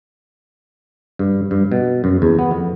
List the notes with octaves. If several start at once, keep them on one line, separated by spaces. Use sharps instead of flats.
G2
G2
B2
F#2
E2
B3
F2